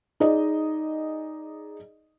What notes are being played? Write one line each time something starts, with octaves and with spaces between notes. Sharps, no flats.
D#4 G#4 D5 D#5